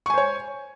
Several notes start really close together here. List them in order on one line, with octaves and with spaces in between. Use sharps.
C#6 G#5 C5 C#5